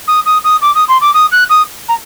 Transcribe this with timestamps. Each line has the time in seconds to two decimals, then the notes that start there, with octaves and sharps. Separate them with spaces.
0.08 D#6
0.26 D#6
0.44 D#6
0.62 D6
0.75 D#6
0.88 C6
1.01 D6
1.14 D#6
1.32 F#6
1.50 D#6
1.88 A#5